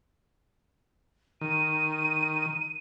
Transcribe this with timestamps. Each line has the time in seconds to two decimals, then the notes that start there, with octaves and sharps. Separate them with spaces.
1.41 D#3 D#7